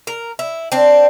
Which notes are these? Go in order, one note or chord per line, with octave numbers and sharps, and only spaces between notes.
A#4
E4
C4 D4